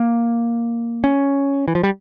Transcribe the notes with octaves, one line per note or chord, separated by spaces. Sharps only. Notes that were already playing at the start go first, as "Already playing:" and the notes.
Already playing: A#3
C#4
E3
F3
G3